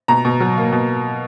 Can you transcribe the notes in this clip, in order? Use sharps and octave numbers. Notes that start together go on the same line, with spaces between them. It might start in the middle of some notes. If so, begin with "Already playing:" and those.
B2 A#5
B2
F#3
A#3
B2